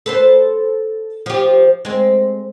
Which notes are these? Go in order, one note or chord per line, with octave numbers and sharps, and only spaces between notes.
A4 B4 C5
F3 G4
G#3 C4